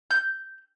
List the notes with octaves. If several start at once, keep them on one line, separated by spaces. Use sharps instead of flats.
G6